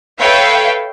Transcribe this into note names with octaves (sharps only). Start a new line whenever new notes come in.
A4 B4 C#5 E5 F5 G5